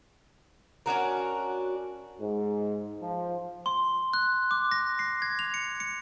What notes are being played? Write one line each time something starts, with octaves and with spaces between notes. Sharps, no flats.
C#4 D4 F#4 A#4
G#2
F3
C6
F#6
D6
A#6
C7
G#6
F7
C#7
C#7